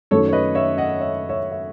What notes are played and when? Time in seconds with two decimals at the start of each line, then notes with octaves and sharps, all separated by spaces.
0.11 F#2 D#3 A3 C#4 A4 C#5
0.28 C#5
0.33 B4 D#5
0.55 C#5 E5
0.78 D#5 F#5
1.00 C#5 E5
1.29 C#5 E5
1.51 E5